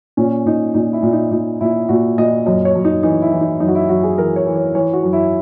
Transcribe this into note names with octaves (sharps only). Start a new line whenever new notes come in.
A#2 C#4
A#2 D#4
A#2 D#4
E4
A#2
D#4
A#2 D#4
A#2 E4
A#2 F#4
A#2 D#5
F#2 D#5
C#5
F#2
D#4
E3 D#4
E4
E3
D#4
F#2 D#4
F#4
E4
F#2 F#4
G#4
E3 A#4
C#5
E3
C#5
E3 C#5
F#4
F#2
E4